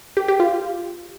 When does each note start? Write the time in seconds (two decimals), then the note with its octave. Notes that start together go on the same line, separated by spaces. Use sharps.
0.17 G4
0.28 G4
0.40 F4